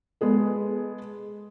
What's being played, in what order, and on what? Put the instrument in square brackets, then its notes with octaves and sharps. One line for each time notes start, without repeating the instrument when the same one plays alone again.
[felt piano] G#3 B3 G#4 A4